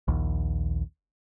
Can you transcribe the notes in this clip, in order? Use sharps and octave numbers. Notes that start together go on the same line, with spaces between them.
A#1 D#2